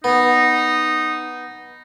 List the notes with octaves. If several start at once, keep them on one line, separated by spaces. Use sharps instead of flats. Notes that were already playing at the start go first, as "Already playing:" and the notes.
B3 D#4